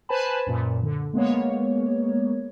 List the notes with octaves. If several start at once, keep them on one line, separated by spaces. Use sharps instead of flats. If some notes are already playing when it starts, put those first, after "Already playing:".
B4 C5 G#5 A5 B5
F#2 A#2
D3
G#3 A#3 B3 C#5